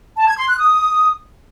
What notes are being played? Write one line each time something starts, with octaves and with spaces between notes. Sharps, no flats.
A5
G#6
C6
F#6
D#6